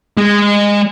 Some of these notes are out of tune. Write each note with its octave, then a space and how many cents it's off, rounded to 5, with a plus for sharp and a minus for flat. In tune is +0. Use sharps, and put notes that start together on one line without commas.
G#3 -20